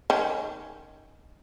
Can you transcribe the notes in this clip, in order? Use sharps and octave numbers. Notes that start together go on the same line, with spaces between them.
D#3 C#4